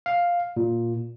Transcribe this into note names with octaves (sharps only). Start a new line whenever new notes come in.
F5
A#2